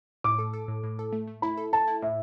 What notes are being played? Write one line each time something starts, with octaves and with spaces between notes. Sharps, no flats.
A2 D6
A4
A4
A2
A2
A4
A3
A3
E4 B5
A4
A4 A5
E4
A2 E5